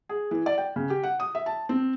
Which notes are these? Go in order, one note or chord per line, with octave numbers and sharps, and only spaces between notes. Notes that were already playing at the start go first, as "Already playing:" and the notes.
G#4
E3
D5
G5
C#3
G4
F#5
D#6
E5
A5
C4